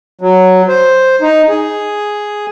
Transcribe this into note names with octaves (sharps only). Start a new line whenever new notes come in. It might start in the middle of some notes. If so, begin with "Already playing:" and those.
F#3
C5
D#4
G#4